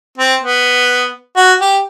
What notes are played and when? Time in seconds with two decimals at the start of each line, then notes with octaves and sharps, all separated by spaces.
0.18 C4
0.42 B3
1.36 F#4
1.61 G4